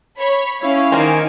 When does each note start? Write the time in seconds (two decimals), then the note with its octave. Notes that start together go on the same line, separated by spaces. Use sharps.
0.20 C#5 B5
0.60 C#4 E4 C#5 F5
0.92 D#3 A#3 C4 G#5